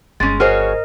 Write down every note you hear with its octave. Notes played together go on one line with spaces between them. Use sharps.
G1 G#3 C#4 A6
F#4 G#4 A#4 C5 C#5 D#5 F6